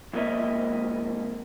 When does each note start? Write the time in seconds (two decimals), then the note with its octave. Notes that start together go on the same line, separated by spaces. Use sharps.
0.13 F2 G#2 A#3 C#4 D#5 E5